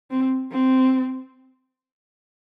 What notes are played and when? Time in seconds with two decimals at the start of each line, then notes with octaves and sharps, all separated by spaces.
0.11 C4
0.52 C4